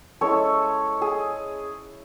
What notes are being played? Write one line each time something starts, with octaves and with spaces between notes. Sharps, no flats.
G#3 C#4 E4 A4 C#5
G#4